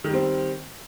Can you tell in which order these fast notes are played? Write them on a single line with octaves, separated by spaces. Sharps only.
D#3 G3 C4